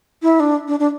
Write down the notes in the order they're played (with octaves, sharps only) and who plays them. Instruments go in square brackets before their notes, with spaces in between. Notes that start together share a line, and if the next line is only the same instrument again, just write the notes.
[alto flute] E4
D4
D4
D4